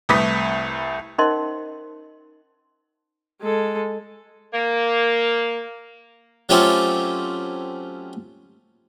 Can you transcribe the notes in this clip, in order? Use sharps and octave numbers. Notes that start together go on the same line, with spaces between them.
C2 A3 B4 D#6 B6
C#4 D#4 A#4 C5 D#5 C6
G#3 A4
A#3
F#3 A3 C4 C#4 F4 G4